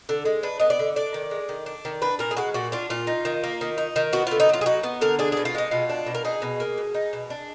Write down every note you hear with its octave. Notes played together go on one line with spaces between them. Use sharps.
D3
G#3
D4 B4
B3 D#5
D5
D3
D4 D5
D#3
G#3
D#3
D4
D#3
D4 B4
A#2 A#4
G#4
G#3 F#4
A#2 F#4
D4 F4
A#2 F4
D#4
D#3
A#3
D#3
D#4
D#3
B3 F#4
F4
D3
D#4
F#3 F4
G#4
D#4 F#4
B3
D3 A#4
D4 G#4
G#4
B2
F4
G#3 D#4
B2 F4
D4
B2
A#4
D#4 G#4
B2
A#3
B2
D#4
B2
D4